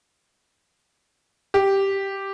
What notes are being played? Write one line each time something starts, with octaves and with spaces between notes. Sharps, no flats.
G4